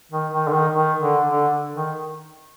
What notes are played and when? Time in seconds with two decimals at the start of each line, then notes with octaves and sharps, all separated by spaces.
0.12 D#3
0.32 D#3
0.48 D3
0.53 D#3
0.74 D#3
1.01 D3
1.28 D3
1.76 D#3